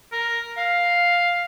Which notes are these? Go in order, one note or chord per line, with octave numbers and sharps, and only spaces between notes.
A#4
F5